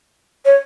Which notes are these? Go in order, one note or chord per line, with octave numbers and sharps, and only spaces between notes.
C#5